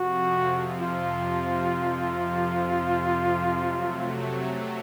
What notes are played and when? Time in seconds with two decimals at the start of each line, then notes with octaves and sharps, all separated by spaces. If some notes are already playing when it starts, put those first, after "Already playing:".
Already playing: F2 C3 F3 F#4
0.81 F4
3.64 C3 F#3 A3